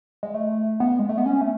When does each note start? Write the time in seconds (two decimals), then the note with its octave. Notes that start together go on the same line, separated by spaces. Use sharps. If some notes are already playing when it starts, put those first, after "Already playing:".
0.23 G#3
0.34 A3
0.80 B3
0.99 G#3
1.09 A3
1.18 B3
1.26 C#4
1.41 A3